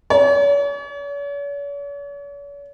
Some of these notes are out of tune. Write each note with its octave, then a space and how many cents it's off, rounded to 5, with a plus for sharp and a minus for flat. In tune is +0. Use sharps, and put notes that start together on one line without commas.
C#5 +45